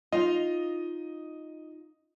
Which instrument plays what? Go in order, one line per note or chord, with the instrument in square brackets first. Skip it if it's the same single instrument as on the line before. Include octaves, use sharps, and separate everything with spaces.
[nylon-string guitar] D#4 F4 [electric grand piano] D#5